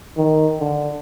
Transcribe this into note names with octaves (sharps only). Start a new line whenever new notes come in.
D#3
D3